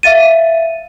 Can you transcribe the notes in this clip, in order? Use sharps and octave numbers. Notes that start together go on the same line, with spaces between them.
E5 F5 A6 D#7